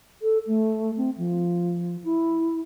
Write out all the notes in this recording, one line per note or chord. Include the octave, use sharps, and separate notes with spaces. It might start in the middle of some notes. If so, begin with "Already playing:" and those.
A4
A3
C4
F3
E4